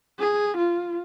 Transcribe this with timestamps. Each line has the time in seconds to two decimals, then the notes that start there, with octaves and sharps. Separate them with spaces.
0.19 G#4
0.58 F4